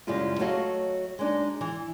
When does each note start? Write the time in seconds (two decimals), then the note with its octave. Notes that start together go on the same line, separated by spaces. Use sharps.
0.07 F#2 C#3 G3 G#3 E4 F4
0.39 F#3 A3 F#4 C#5 D#5 F5
1.19 G#3 D4 D#4
1.61 E3